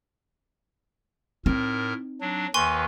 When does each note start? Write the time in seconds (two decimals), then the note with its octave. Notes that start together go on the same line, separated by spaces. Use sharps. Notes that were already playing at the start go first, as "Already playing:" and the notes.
1.46 A2 C4 D#4 A#4
2.21 F#3 D4
2.54 D#2 D#3 B4 G#5 C6 C#6